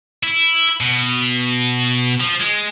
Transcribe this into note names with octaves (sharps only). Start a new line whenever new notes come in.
E4
B2
F3
G#3